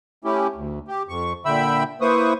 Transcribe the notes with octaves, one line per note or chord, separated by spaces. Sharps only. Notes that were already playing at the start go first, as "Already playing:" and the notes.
A3 C#4 E4 G4
D2
G4
F2 C#6
A#2 D3 E5 G5 B5 E6
A#3 E4 B4 C5 C#6 D#6